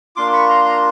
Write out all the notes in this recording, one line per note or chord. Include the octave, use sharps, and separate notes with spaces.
A#3 D4 F4 C6 D6
B5 C#6
A#5 C6
A#5 C6